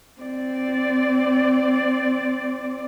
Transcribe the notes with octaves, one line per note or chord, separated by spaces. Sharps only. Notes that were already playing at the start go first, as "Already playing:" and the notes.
C4 D5